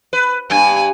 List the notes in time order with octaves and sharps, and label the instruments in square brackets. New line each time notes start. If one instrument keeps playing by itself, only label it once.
[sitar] B4
[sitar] G2 [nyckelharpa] G#5